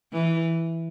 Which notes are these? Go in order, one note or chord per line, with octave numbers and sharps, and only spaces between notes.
E3